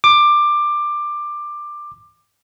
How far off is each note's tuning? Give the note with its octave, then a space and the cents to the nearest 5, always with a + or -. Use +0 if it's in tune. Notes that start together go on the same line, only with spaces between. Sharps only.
D6 +15